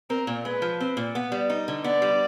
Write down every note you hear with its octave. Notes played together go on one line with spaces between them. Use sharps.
C4 A#4
A#2
G#3 B4
F3
C4
A#2
B3
G3
D#4
D3
B3 D5
G3